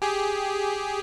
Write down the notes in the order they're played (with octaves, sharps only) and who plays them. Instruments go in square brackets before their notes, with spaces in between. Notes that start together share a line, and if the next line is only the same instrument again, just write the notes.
[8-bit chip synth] G4 G#4